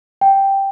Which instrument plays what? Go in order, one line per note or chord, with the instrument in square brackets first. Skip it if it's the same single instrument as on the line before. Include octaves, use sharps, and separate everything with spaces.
[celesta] G5